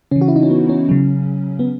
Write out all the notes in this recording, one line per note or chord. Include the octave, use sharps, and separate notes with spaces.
C#3 E3 C#4
F#4
E4
D#4
C#4
B3
C#4
C#3 F#3
B3